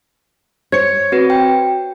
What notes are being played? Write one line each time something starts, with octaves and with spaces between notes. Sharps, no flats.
C5 C#5 G#6 C#7
C4 F#4 B4
G5